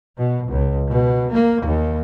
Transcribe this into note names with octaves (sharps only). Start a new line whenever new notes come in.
B2
C#2
B2
A#3
D#2